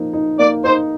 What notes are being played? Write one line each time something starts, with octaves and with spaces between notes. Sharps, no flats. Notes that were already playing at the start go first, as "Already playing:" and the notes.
Already playing: F3 A#3 D#4
D#4
A#3 D5
D#4 C5